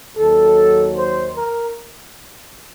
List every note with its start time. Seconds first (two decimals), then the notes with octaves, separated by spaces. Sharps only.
0.17 D#2 D#3 F#3 A4
0.95 C5
1.36 A#4